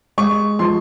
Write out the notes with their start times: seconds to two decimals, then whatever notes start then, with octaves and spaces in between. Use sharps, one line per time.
0.18 G#3 C#6
0.59 F3 C6